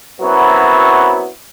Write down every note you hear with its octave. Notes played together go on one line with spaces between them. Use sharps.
F#2 F#3 B3 C4 E4 F#4